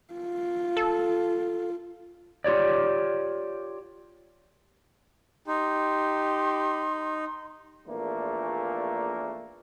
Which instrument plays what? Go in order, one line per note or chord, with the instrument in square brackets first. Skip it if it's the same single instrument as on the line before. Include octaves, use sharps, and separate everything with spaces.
[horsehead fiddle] F4
[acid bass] A4
[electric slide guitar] F4 G4 C#5 D5
[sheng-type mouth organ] D#4 [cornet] G4 [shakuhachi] C6
[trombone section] A#1 E2 A#2 A3 A#3